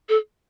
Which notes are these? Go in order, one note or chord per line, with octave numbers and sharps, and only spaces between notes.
A4